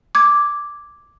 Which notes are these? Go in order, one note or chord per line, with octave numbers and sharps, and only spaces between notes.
D6 G#6